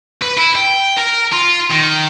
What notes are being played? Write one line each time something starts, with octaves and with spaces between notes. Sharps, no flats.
B4
E4
G5
A#4
F4
D#3